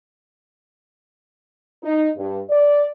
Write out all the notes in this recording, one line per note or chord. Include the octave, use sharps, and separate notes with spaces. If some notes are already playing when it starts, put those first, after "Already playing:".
D#4
G2
D5